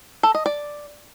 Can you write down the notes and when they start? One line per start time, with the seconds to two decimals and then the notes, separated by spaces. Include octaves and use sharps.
0.23 A4
0.35 D#5
0.46 D5